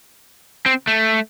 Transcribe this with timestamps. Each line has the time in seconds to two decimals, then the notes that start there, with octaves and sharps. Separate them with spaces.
0.66 C4
0.87 A3